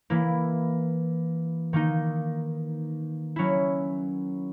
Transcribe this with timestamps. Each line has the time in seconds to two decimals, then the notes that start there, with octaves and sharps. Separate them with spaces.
0.10 E3 A#3 E4
1.73 D#3 A#3 D#4
3.36 F#3 C#4 E4